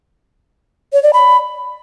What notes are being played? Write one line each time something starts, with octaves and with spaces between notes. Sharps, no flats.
C#5
D5
B5